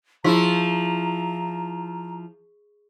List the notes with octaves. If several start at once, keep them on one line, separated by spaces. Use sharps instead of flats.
F3 E4 G#4 A#5 C#6 B6